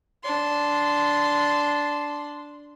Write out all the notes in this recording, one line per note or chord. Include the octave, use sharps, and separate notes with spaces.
D4 C6